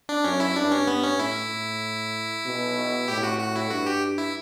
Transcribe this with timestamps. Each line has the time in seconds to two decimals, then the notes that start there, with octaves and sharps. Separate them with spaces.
0.09 D4
0.24 F#2 C#4
0.40 E4
0.56 G2 D4
0.71 C#4
0.87 B3
1.04 C#4
1.18 A2 E4
1.50 A2
2.45 B2
3.08 A2 G4
3.23 F#4
3.39 F#4
3.56 E4
3.70 G2 F#4
3.86 G4
4.18 E4